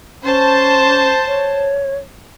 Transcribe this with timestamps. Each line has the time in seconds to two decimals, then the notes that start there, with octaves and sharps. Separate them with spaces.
0.23 C#4 C5 A5
1.27 C#5